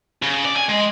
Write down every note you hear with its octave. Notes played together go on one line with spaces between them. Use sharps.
C#3
D5
G#5
G#3